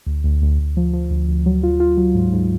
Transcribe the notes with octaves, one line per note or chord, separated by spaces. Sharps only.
D2
D2
D2
D2
F3
F3
D2
D2
F#3
F4
F4
F#3
G#2
G#2